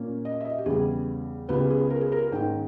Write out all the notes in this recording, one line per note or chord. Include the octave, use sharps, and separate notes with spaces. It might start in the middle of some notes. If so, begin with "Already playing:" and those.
Already playing: A#2 A#3 C#4
D#5
E5
D#5
G4
E2 C#3 G3 G#4
C#2 C#3 G#3 B3 G4
G#4
A#4
G#4
A#4
G#2 D#3 A#3 C#4 G5